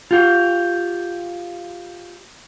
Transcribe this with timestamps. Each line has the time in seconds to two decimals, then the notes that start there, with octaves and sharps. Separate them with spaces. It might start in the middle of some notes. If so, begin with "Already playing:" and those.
0.11 F4 G4